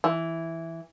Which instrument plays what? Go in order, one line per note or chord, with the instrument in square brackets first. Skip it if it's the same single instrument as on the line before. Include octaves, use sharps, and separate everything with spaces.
[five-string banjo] E3